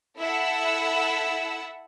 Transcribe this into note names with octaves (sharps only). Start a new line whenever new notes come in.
E4 A4 F#5 E6